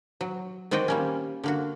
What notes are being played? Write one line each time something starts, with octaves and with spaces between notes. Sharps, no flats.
F#3
D#3 C4 F#4 D5 D#5 G5
G3 A#3 C#4
D3 A#3 F#4